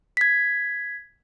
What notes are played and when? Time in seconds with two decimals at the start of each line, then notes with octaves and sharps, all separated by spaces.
0.17 G#6 B6